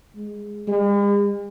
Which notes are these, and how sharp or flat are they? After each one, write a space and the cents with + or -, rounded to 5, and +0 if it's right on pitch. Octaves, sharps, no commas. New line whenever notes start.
G#3 -5
G#3 -45